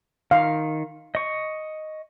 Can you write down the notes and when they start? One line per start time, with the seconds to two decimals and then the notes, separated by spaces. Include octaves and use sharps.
0.31 D#3 F5
1.15 D#5 C#6